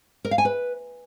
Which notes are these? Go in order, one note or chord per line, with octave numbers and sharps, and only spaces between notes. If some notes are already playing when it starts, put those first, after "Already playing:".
A#4
F5
G#5
B4